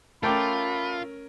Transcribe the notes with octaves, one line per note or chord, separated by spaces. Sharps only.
A3 C#4 F4 A#4 G5 B5 D6